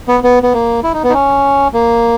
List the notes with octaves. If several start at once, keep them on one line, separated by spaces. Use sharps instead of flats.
B3
B3
B3
A#3
E4
D#4
B3
D#4
C#4
A#3